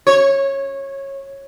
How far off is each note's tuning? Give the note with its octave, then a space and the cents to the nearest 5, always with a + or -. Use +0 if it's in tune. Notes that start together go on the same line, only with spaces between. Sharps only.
C#5 -15